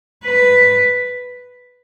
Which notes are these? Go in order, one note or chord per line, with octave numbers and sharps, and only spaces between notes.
B4